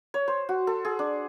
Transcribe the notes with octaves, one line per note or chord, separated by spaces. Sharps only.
C#5
C5
F#4
A4
G#4
D4